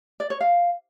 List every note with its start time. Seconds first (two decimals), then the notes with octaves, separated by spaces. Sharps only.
0.20 D5
0.30 C#5
0.41 F5